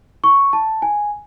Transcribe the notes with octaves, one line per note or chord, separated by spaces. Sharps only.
C#6
A5
G#5